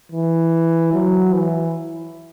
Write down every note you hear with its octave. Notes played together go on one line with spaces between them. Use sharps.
E3
F#3
E3